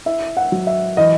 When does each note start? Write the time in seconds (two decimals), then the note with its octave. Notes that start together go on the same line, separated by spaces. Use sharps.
0.06 E4 E5
0.37 F#5
0.52 F#3
0.67 E5
0.97 E3 D#5